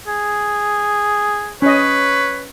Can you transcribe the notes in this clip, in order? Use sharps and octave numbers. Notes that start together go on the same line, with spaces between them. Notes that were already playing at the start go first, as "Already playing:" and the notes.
G#4
C#4 B4 C#5 D#5